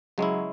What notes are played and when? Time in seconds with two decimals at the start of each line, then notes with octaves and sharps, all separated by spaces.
0.18 C#3 F#3 G#3 C#4 E4